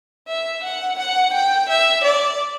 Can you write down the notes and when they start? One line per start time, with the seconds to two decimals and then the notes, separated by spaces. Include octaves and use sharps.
0.27 E5
0.63 F#5
0.98 F#5
1.33 G5
1.69 E5
2.04 D5